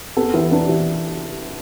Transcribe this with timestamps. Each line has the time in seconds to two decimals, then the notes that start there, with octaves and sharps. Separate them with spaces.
0.17 B3 A4
0.34 E3 B4
0.51 D4 B4
0.69 E3